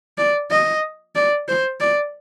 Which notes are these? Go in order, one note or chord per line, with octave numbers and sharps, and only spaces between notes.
D5
D#5
D5
C5
D5